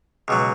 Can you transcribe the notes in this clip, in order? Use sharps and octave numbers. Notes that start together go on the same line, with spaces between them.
C#2 B2 F#3